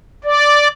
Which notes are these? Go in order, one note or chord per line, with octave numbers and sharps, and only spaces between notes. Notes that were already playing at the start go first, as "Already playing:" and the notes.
D5